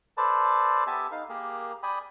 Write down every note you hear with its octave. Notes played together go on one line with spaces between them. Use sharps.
A4 B4 C5 D5 A5
B3 G4 A4 E5 G#5 A5
D#4 F5
A#3 G4 G#4 A#4
D5 G5 G#5 B5 D#6